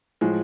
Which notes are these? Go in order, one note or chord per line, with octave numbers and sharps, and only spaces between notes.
A2 F3 G#3